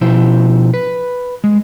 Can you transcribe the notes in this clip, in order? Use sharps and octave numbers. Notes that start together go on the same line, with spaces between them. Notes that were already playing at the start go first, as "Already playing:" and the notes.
B2 F3 E4 C5
B4
G#3